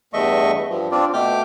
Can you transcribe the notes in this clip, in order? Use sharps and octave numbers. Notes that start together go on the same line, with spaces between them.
E2 G2 A3 D#5 E5 C#6
G2 F3
C4 D4 F4 D5
B2 A3 G5 D6 F6